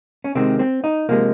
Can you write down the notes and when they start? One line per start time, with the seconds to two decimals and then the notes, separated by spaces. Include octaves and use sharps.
0.24 C#4
0.35 C3 D#3 G#3 C4
0.59 C4
0.84 D#4
1.09 C3 F3 G#3 A#3